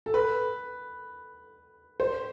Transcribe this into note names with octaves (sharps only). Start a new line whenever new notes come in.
A4
B4
C5